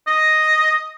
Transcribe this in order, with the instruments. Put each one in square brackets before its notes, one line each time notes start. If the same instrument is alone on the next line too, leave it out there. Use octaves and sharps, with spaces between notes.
[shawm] D#5